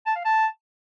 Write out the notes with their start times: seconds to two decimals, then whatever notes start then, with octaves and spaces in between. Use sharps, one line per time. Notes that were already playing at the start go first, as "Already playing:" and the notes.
0.06 A5
0.16 F5
0.25 A5